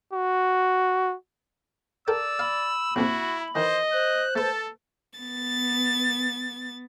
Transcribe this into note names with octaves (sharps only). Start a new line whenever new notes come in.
F#4
A4 A#4 D5 G5 E6
F5 B5
A#1 F2 C3 E4 F#4
D#3 E3 C5 D#5
C5 F#6
A3 A4 B4 A5
B3 A6